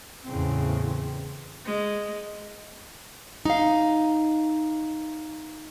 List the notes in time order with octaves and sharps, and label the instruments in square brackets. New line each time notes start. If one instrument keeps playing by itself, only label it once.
[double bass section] E2 A2 C#3 C4
[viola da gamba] G#3
[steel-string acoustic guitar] D#4 F5